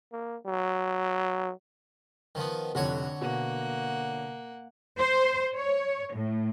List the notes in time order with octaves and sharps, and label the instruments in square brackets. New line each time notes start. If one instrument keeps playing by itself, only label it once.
[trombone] A#3
F#3
[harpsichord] D#3 F3 B3
[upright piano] F1 F2 [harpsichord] D3 F#4 C#5
[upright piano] B2 [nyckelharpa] A#3 F#5
[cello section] C5
C#5
A2